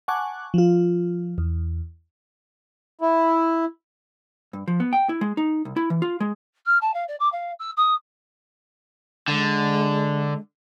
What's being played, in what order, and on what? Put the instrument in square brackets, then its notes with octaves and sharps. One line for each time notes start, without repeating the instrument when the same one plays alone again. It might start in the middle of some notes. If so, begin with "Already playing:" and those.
[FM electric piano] F#5 G#5 A5 C#6 D6 F#6
F3 F4
E2
[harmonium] E4
[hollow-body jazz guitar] G2
F3
B3
G5
E4
G#3
D#4
C2
E4
E3
F4
G#3
[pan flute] F6
A5
F5
D5
D6
F5
E6
D#6
[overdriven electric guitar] D3 [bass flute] G#3